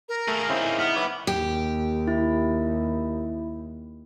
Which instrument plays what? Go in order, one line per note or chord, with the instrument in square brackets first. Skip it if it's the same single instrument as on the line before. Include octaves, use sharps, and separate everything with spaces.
[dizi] A#4
[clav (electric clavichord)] A3 [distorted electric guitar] A#3 G#4
[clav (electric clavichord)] C#3 C4 [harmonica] D#4 E4
[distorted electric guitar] B3 [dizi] F6
[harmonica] B4 B5 D6 [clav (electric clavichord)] C#5 [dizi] E5
[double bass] D#2 [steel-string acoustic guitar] G4
[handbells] E4